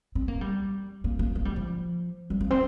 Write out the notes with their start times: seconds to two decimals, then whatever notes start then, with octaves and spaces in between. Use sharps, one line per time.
0.15 C4
0.28 A#3
0.41 G3
1.04 A#3
1.19 A#3
1.35 A#3
1.45 G3
1.56 F3
2.30 G3
2.41 A#3
2.50 C4